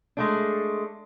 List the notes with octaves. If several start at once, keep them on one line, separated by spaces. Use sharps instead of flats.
G#3 A3 D4